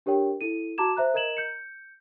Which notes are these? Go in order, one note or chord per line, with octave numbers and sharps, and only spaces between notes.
D4 G4 A#4 C#5 G5
E4 A4 D#7
F#4 A5 A#5 D6 G#6 E7
C5 E5 A#5 F#6
A#4 D#5 A#5 G#6 E7 F#7
G6 C#7